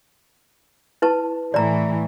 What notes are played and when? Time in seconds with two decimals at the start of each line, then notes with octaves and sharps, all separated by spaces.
1.02 E4 B4 A5
1.54 A2 E3 A3 D5 A#5